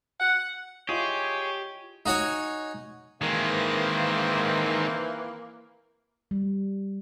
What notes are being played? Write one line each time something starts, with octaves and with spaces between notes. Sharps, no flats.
F#5
E4 F4 G4 G#4 C#5 D#5
D#4 F#4 C#5 G#5
D#3 E3 G#3 A#3 C4
G3